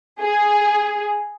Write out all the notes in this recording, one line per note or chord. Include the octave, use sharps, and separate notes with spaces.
G#4